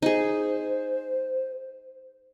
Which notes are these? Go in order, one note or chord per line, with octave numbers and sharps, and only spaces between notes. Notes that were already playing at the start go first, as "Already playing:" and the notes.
D#4 G#4 C5